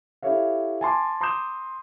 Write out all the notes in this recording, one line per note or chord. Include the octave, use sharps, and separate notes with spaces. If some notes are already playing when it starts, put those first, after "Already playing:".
E4 G4 A4 C#5 E5 F5
G#5 A5 C6 D6
A#5 C6 D6 D#6 G6 E7